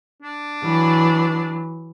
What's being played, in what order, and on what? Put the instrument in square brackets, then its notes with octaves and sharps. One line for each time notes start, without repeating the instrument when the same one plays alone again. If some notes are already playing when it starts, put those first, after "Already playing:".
[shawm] D4
[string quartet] E3 F#3